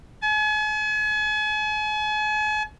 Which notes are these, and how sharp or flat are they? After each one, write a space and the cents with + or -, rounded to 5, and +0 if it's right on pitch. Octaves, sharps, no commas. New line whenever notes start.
G#5 +40